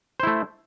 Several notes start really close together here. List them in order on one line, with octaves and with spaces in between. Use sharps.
C5 E4 A3